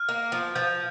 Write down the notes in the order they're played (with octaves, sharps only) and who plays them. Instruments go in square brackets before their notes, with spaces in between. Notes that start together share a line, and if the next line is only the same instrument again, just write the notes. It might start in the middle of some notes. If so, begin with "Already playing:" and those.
Already playing: [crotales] F6
[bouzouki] A#3
F3
[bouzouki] F3 [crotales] G6